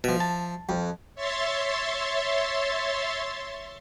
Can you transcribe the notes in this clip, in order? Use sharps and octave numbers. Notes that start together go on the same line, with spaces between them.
B2 F3 E5
A5
F2
C#5 E5 C6 A6